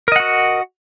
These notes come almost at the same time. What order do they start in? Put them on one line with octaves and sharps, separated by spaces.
A#4 D#5 F#5 F#4